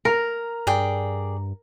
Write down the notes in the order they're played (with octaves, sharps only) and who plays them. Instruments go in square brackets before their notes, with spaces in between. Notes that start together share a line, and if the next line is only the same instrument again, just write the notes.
[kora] A#4 [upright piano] A#5
[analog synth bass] G2 [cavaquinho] G#4 D5 G5